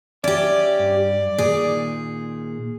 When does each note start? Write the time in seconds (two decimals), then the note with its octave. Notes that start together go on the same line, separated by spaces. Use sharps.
0.24 C#4 G4 D5 E5
0.79 G2
1.38 A#2 D#3 G#4